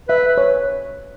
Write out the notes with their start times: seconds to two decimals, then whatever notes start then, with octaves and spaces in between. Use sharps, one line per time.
0.08 B4 E5
0.28 B4
0.38 C#5